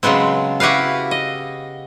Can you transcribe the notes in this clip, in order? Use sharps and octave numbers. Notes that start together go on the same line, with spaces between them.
C#3 F#3 G#3 B3 C4
E4 F#4 G4 B4 F5
D#5